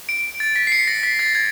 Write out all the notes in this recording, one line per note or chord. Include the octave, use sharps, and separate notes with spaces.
D7
A6
B6
C7
C#7
A#6
B6
A6
G#6